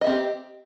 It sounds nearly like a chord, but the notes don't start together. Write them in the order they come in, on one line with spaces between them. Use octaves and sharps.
D#5 E5 C4 G4